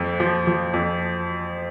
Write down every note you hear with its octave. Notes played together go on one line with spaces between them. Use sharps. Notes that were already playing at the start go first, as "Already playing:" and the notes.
Already playing: F2 F3
F3
F3
F2